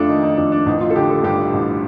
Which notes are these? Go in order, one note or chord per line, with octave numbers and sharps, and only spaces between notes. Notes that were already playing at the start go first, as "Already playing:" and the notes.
Already playing: F2 A3 D4 F4 A4
D#3 D#4
D#4
F2 D4
D4
A1 D#4
F4
A4
D3 G4
A4
G2 G4
A1